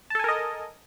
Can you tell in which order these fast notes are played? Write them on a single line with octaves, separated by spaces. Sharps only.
A5 A4 G#5 A#4 D#5